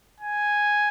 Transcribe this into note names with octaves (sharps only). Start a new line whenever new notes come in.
G#5